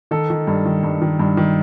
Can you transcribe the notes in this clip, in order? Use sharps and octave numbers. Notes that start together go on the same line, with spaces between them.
D#3 A4
D#3
G2
D#3
G2
D#3
G2
D#3